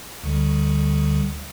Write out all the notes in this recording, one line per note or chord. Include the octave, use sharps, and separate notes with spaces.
D2 D3 G3